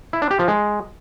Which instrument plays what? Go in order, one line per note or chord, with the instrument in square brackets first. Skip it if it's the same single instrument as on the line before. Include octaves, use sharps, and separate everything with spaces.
[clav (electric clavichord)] E4
D4
G4
F3
G#3